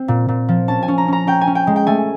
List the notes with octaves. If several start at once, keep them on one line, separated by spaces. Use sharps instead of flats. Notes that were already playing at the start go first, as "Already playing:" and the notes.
Already playing: C4
A#2
A#2
F3
C#4 A5
G#5
C#4
A#5
C#4 A#5
C#4 G5
G#5
C#4
G5
G#3
G5
A3 G#5